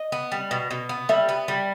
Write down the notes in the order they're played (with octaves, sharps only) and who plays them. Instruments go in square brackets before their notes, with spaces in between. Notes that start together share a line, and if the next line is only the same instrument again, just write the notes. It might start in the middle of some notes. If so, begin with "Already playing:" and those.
Already playing: [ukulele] D#5
[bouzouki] B3
G3
B2
B2
B3
[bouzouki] G3 [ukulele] E5
[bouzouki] B3
G3